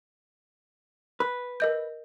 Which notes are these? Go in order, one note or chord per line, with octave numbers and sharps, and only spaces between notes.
B4
A#4 D#5 G6